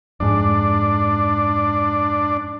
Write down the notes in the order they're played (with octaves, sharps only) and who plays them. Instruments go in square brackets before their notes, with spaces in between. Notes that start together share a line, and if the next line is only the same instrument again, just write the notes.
[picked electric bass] F2 G#2 [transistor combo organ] D4